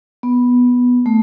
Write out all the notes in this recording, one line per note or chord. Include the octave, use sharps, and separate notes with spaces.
B3
A3